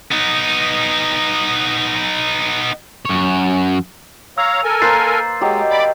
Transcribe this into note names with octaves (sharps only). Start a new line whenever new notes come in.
B3 D#4
F#2 C#5
C#5 F5 A#5 E6
A4 A#4 G#5
A#3 B4 C5 A#5 A6 C7
F#3 G#3 G4 D#5
D5 B5 D6